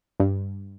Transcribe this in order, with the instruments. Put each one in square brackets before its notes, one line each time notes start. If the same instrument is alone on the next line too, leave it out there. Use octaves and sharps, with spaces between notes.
[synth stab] G2